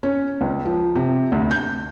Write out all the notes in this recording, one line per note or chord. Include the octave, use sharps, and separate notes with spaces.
C#4
C#2
F3
C3
D2
G6